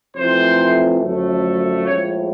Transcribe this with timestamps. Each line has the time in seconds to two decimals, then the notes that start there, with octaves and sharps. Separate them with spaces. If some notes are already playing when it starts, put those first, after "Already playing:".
0.16 F2 C3 E3 A3 C5
1.01 F#2 D3 F3 A3
1.86 A#1 A2 F3 G#3 C#5